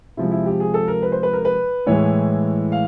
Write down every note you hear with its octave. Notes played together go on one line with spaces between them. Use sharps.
C3 F3 G#3 E4
E4
G4
G#4
A4
A#4
B4
C5
B4
A#4
B4
A2 E3 G#3 C#5
F5